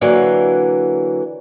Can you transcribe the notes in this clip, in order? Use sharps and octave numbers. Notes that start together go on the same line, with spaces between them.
D3 E3 F#3 A#3